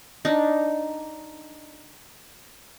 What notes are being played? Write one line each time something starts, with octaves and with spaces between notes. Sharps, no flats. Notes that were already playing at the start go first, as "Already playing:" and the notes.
D4 D#4